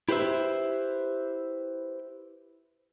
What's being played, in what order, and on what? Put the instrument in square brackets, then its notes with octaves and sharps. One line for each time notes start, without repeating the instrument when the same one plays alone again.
[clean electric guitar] E4 G4 B4 C5 E5